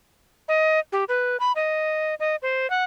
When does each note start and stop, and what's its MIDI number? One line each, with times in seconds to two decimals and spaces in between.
0.48 0.79 75
0.92 1.04 67
1.09 1.37 71
1.40 1.52 83
1.56 2.15 75
2.20 2.36 75
2.42 2.69 72
2.70 2.84 78